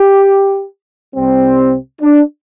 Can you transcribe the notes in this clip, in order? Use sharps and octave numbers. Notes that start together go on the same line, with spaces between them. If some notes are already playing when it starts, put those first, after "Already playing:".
Already playing: G4
C2 C3 G3 C4
D4